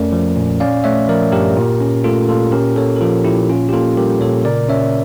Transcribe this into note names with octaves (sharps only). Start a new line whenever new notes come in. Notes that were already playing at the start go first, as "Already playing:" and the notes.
Already playing: F2 A3 C#4 A#4 D5
F3
A#2
C#4 D5 F5
A3 C#5 E5
F3 A#4 D5
G2 G4 A#4
A#2
C#4
A3 F4 A4
A#2 F4 A4
C#4 G4 A#4
A#3 A4 C#5
A#4
F3 F4 A4
A#2 E4 G4
C#4 F4
G4
A#3 F4 A4
G3 G4 A#4
A#2 A4 C#5
C#3 A#4 D5
C#4 C#5 E5